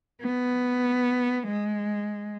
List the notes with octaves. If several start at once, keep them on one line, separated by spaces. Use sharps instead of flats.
B3
G#3